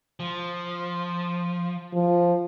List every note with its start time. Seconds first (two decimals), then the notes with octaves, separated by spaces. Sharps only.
0.20 F3
1.94 F3